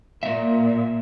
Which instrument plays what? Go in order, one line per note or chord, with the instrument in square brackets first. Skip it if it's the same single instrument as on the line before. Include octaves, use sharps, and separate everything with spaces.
[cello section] A#2 [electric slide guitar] A#3 E5